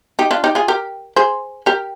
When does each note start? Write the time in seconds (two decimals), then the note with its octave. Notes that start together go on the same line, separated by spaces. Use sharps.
0.19 D#4 G4
0.31 D4 F4
0.44 D#4 G4
0.55 F4 G#4
0.68 G4 A#4
1.16 G#4 C5
1.66 G4 A#4